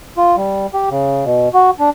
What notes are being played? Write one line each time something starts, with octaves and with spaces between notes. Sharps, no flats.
F4
G3
G4
C#3
B2
F#4
D4